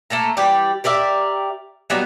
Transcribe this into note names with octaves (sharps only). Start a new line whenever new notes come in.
A3 A#3 A4 A#5
E3 G3 G4 D5
G4 A#4 D5 E5
F#3 G3 B3 D#4